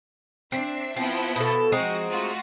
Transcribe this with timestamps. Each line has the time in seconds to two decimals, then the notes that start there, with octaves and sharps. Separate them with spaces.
0.52 C4 D4 E5 C7
0.96 F3 B3 C4 E4
1.36 B2 A4
1.72 F3 G#3 C4 D#4 F#4
2.08 A3 F4 F#4